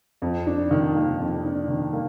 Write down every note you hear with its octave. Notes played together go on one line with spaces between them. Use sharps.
F2
D4
D#3
A#3
F2
D4
D#3
A#3